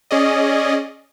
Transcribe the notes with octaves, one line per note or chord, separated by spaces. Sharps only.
C#4 G#4 D5 D#5